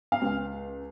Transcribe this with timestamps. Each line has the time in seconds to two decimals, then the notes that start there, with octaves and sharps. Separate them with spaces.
0.12 F5
0.22 C#2